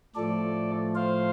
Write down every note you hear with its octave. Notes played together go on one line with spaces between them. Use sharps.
A2 F3 A3 A4 D5
C5 F5